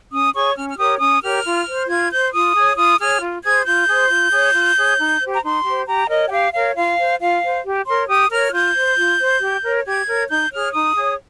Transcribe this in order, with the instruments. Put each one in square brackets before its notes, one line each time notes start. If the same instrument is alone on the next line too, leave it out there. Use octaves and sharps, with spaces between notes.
[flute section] C#4 D#6
G#4 C#5 C#6
C#4 F6
F6
G4 A#4 C#5 D#6
C#4 D#6
G4 A#4 C#5 F6
F4
C5
F4 G#6
C5 G6
F4 D#6
G#4 C#5
F4 D#6
G#4 C#5 F6
F4
G#4 C5 G#6
F4 G6
G#4 C5
F4
G#4 C#5
F4
G#4 C#5
D#4
G4 C5
A#5
D#4 C6
G4 C5
G4 A#5
A#4 C#5 D#5
G5
G4 F5
A#4 C#5 F5
F4 F5
C5
F4 F5
C5
G4
A#4 C#5 C6
G4 D#6
A#4 C#5 F6
F4 G6
C5
F4
C5
G4
A#4 C#5
G4 G#6
A#4 C#5
D#4 G6
G#4 C#5 F6
D#4 D#6
G#4 C#5